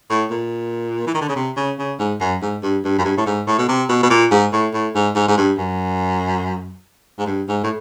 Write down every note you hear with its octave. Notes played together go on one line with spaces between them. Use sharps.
A2
A#2
E3
D#3
D3
C#3
C3
C#3
C#3
G#2
F#2
G#2
G2
G2
F#2
G2
A2
G#2
A2
B2
C3
B2
B2
A#2
G#2
A2
A2
G#2
G#2
G#2
G2
F#2
G#2
G2
G#2
A2